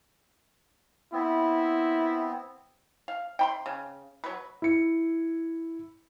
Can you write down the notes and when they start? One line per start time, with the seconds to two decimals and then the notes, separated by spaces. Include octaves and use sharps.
1.13 B3 C4 E4
3.08 F5
3.39 G5 B5 C6
3.66 C#3
4.24 F#3 B4
4.62 E4 C#7